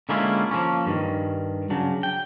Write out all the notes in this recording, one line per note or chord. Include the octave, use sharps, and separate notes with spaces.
D3 G#3 A#3 C#4 E4 F4
F3 A#3 C#4
G2 D#3
C#3 F#3 D4
G5